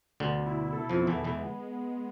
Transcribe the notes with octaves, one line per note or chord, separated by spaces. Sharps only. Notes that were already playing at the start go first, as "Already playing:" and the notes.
D2 B2 D3
E4
A4
F2 F3
B3
E2 E3
E2 E3 G#3